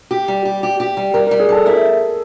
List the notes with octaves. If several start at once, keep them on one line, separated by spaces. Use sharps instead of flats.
G4
G3
G4
G4
G4
G3
G3 A#4
A#4
G3
G#4
G3 A4
E4 A#4